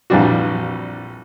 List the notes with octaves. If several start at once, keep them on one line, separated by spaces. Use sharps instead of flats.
A#1 F2 E3 G3 D4 F#4